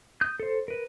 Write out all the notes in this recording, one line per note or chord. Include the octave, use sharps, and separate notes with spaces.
D#6 G6
A4 C5
A#4 B4